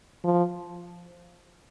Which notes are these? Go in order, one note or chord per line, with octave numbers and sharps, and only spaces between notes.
F3